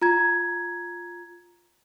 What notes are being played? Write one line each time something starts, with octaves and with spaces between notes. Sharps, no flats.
F4 A#5 G#6